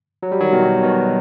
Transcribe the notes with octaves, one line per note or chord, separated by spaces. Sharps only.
F#3
G3
D#3 F#3
B2 D#3
B2 D#3